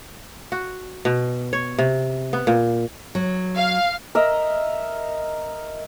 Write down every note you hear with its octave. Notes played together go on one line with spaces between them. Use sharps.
F#4
B2
C#5
C3
B3
A#2
F#3
F5
A#4 D#5 E5